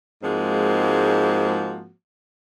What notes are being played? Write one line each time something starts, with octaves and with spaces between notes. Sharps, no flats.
G#2 F3 G#3 A#3 C4 F#4